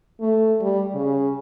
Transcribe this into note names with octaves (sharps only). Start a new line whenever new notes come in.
A3
G3
C#3